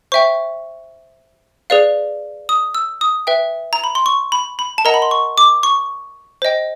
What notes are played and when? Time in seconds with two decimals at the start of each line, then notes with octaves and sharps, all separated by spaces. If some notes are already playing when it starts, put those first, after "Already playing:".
0.12 C5 E5 G5 C#6
1.70 G#4 B4 D5 F5
2.49 D#6
2.75 E6
3.01 D#6
3.27 B4 E5 G5
3.73 A#5
3.84 B5
3.95 C6
4.06 C#6
4.32 B5
4.59 B5
4.78 A5
4.85 A#4 D#5 F#5 A#5
4.94 B5
5.02 C6
5.11 C#6
5.38 D6
5.63 C#6
6.42 C5 D#5 G5